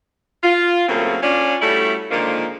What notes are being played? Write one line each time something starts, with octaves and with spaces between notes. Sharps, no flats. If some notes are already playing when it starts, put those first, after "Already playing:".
F4
F#2 A2 C#3 A3 A#3 C4
C#4 D4 F4
G3 A3 C#4 E4 F#4 A4
A#2 D3 D#3 F3 G#3 A#3